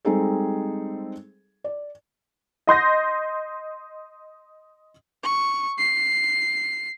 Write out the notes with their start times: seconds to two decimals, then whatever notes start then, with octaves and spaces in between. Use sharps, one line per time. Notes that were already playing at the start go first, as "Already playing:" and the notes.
0.05 G3 G#3 C4 D#4 G#4 A4
1.64 D5
2.67 D#5 C6 G6 A#6
5.24 C#6
5.78 C7